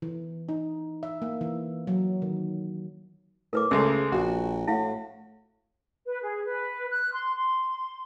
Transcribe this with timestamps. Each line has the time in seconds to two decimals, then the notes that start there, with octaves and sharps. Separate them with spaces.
0.02 E3
0.49 D#4
1.03 E5
1.22 A#3
1.41 E3
1.87 F#3
2.22 D#3
3.53 A2 A#4 B4 D6
3.71 C#2 C#3 G#3 A3 E6
4.12 A#1 F#4
4.68 A2 E4 F5 F#5
6.06 B4
6.22 G#4
6.45 B4
6.90 F#6
7.12 C6
7.36 C6